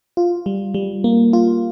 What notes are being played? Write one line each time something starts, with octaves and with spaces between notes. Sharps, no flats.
F4
G3
G3
A#3
F4